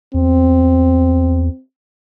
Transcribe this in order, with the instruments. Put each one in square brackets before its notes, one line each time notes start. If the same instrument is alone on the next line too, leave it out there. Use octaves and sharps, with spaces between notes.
[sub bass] E2 [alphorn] C4